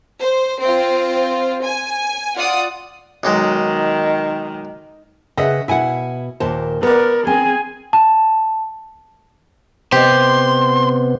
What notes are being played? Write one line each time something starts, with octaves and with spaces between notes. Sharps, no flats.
C5
C4 F4
G#5
F4 D5 F#5 D#6
B1 D#3 F#3 G#3
C#3 B4 D#5 E5 F#5
B2 E4 F#5 G#5
D#2 A#2 C5 A5
B3 A#4 B4 D5
C4 G#4 G#5
A5
C3 B3 G4 C5 D#5 C6